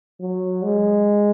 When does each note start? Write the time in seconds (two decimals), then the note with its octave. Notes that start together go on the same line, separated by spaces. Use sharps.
0.21 F#3
0.63 G#3